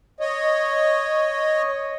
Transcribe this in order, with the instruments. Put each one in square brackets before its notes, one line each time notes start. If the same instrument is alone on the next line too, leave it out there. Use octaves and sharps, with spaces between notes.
[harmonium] C#5 D#5